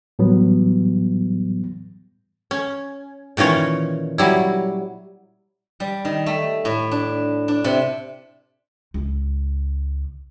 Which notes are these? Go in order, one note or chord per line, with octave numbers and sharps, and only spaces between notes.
A2 E3 F#3 G3 B3
C#4
A#2 D#3 E3 C#4 C#5
F#3 G3 E4
G3
D#3
A3
A2
D4
D4
C3
C#2